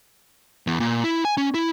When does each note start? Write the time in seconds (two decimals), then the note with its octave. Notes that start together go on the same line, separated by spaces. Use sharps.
0.67 E2
0.80 A#2
1.04 E4
1.25 G#5
1.37 C#4
1.54 E4